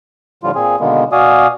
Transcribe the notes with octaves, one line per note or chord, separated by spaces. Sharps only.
A2 D3 F3 G3 F4
A#2 C4 G#4
B2 D3 D#3 G#3 A#3 B3
B2 F#4 D5 F5 G#5 D#6